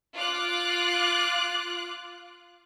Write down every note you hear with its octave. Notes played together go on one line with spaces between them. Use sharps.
F4 D6 F#6